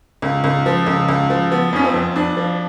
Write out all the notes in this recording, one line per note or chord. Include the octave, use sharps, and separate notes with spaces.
C#2
C#2
F3
C#2
C#2
F3
F3 B3
F2 C#4
C4
F2
F2 D4
F3